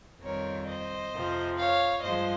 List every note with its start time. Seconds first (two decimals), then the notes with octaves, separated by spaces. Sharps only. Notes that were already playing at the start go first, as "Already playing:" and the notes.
0.22 F2 D#3 G3 C4 A#4 C#5
0.67 C5 D#5
1.12 F2 C3 F3
1.57 C#5 F5
2.02 G2 F3 G#3 C5 D#5